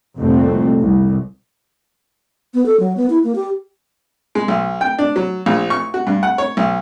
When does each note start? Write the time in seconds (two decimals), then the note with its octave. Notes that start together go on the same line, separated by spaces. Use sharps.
0.17 F1 C2 F2 A#2 A3 C4
0.80 C2
2.54 B3
2.66 A4
2.80 F#3
2.97 B3
3.10 E4
3.24 A#3
3.36 G4
4.35 G#3
4.48 B1
4.81 G5
4.99 D4
5.16 F#3
5.46 A#1
5.70 C#6
5.94 F#4
6.07 G2
6.23 F#5
6.38 C#5
6.57 B1